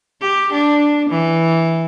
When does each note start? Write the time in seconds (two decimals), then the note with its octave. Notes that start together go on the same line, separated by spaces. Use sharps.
0.21 G4
0.53 D4
1.10 E3